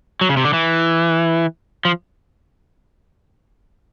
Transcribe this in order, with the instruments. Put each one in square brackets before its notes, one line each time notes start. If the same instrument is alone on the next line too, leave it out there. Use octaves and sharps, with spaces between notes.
[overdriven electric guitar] F#3
C#3
C3
D3
E3
F3